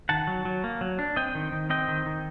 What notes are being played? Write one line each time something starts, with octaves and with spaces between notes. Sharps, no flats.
D#3 F#5 A5
F#3
F#3
A#3
F#3
D4
C4 D#5 G5
D#3
D#3
C4 D#5 G5
D#3
D#3